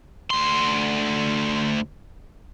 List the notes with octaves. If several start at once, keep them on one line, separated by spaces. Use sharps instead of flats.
D2 C6